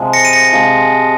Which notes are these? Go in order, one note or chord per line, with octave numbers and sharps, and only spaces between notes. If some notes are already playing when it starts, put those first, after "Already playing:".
Already playing: C3 F3 G#3
A#6 C#7
D#7
A#6 C#7
C3 F3 G#3